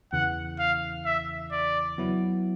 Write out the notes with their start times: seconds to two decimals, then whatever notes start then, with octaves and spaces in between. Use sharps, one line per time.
0.12 E2 C#3 E3 F#5
0.59 F5
1.05 E5
1.52 D5
1.98 F#3 B3 E4